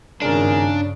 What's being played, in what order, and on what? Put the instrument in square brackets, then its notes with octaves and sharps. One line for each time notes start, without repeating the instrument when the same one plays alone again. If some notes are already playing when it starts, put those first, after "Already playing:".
[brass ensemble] G#1 G#4 A#4 [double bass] G2 C#3 [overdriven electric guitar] D4